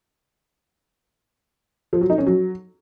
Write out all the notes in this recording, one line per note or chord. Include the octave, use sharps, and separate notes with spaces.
F3
F#3
D#4
C#4
F#3